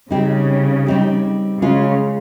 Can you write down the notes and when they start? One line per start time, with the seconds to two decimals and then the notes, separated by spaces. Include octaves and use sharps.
0.11 C#3 G3 C4 D#4 G4
0.87 G3 C4 D#4 G4
1.62 C#3 G#3 C#4 F4